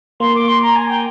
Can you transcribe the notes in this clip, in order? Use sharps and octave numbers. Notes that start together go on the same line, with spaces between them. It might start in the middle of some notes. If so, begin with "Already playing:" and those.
A#3 C6
D6
C6
A#5
G#5
G5